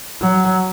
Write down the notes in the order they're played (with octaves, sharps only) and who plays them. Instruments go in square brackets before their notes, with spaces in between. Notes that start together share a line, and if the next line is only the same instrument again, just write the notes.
[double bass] F#3